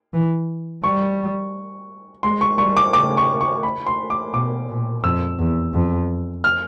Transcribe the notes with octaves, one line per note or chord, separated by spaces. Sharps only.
E3
G3 C#6
G#3 C6
C#6
G3 C#6
D6
C#3 D6
C#6
C#6
B5
C6
D6
B2 D6
A#2
F2 E6
E2
F2
F6